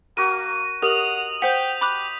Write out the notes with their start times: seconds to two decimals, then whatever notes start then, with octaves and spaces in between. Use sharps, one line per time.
0.17 A#3 F#4 A#4 D#7
0.82 G4 A#4 D#5 F#5 D#6 F7 F#7
1.42 C5 F#5 G5 G6 B6
1.81 G4 B5 D6 F#6